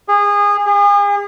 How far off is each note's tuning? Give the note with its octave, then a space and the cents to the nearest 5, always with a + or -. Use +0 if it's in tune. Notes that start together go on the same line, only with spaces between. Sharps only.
G#4 -25
G#4 -40